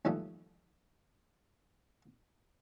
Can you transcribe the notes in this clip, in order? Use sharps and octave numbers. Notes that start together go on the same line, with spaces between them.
D#2 G#2 E3 F3 G3 A3